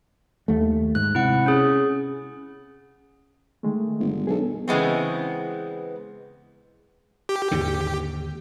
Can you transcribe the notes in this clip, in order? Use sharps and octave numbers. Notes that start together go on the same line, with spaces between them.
D#2 A3
G#2 F#6
C3 E4 F#5
C#4 G#4
D#3 G#3 A3
G1
B1 G#4 A4
C#3 E3 G#3 B3 C4
G4
D#2 G#2 D3